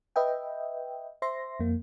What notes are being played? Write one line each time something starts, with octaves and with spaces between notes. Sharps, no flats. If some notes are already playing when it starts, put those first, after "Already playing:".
B4 D#5 E5 G5
C5 E5 C6 A#6
F2 A#3